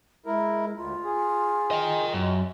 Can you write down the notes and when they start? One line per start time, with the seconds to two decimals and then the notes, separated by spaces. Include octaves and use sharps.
0.26 G#3 E4 A#4
0.77 D2 F4
1.04 G#4
1.71 D#5 G5
2.13 F#2